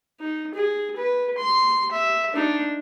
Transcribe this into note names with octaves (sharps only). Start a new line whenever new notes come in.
D#4
G#4
B4
C6
E5
D4 D#4